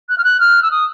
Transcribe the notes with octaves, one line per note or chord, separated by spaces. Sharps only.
F#6
F6
F#6
F6
E6
D#6